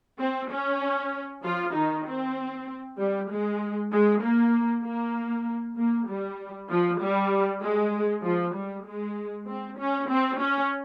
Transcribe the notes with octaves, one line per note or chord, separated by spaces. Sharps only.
C4
C#4
F3 F4
D#3 D#4
C4
G3
G#3
G#3
A#3
A#3
A#3
G3
F3
G3
G#3
F3
G3
G#3
C4
C#4
C4
C#4